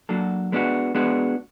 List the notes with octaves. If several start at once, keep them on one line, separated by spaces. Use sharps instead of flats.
F#3 A#3 D4 F#4 A4
G#3 B3 D4 F#4
G#3 B3 D4 F#4